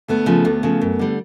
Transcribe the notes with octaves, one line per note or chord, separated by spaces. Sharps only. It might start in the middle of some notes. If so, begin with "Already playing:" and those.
D2 A3 B3
C#3 F3
D2
C#3 F3
F#2
D3 G3